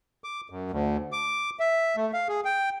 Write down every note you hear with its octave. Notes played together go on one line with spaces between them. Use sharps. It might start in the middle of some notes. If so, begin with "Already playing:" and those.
D6
F#2
D2
D6
E5
A3
F5
G#4
G5